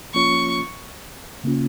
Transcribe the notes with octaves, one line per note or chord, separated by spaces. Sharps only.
F3 A#3 C#4 F4 C#5 C#6
C#3 A#3 C#4 F4